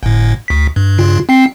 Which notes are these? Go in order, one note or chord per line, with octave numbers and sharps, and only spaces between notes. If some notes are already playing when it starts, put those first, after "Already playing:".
G1 A2
D2 B6
G2
G2 C#3 F4
C4 G5 C7